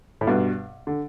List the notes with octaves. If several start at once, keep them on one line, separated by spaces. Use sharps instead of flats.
A2
G2 B2
D3